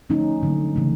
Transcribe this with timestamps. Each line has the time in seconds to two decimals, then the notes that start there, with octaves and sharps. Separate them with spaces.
0.09 D3 F3 A3 C#4 D#4
0.43 D3 F#3 A#3
0.76 C#3 E3 A3